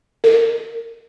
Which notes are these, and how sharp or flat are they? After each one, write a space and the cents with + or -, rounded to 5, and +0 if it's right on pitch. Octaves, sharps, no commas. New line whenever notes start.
A#4 -25